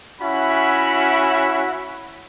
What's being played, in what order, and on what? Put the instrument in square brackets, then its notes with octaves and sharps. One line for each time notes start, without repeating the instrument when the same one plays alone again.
[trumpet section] C#4 E4 F#4 E5 F#5 B5